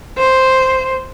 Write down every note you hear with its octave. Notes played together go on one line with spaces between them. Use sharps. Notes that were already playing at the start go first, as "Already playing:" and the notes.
C5